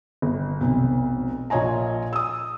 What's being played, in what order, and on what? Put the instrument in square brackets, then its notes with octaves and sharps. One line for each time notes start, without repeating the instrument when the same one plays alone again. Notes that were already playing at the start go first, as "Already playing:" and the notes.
[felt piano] G1
F1 B1
A#1 F4 C#5 D#5 G#5 A#5
D#6 E6